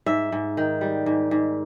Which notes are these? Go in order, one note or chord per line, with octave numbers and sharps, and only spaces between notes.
G#2 E5
G#2
D#3
G3
G#2
G#2